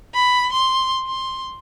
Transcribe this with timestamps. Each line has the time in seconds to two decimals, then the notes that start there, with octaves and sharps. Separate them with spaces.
0.14 B5
0.52 C6
1.08 C6